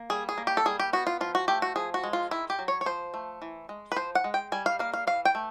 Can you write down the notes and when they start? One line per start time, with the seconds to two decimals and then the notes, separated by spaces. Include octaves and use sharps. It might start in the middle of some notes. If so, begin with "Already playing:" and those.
Already playing: A#3
0.10 G3 G#4
0.29 G#4
0.38 A#3
0.47 G4
0.57 A4
0.66 G3 G#4
0.79 G4
0.93 B3 F#4
1.07 F4
1.21 F3 F4
1.35 F#4
1.48 A3 G4
1.62 F#4
1.76 F3 G#4
1.94 F#4
2.03 G#3
2.13 F4
2.31 D#3 E4
2.50 G4
2.59 F#3
2.68 C#5
2.81 C#5
2.86 F3 C5
3.14 A3
3.42 E3
3.69 G#3
3.92 B4
3.96 F3 C5
4.15 F#5
4.24 G#3
4.34 G5
4.52 G3 G#5
4.66 F5
4.79 A#3 F5
4.94 F5
5.07 E3 F5
5.25 G5
5.35 A3